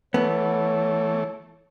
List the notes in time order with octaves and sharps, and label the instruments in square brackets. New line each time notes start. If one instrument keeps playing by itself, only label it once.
[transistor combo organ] E3 A3 [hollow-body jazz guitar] B3 [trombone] C#5